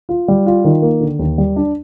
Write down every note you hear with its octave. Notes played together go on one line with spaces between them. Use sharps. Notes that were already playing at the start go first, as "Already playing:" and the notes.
F4
G3
F4
D#3
A#3
D3
D#2
G3
D4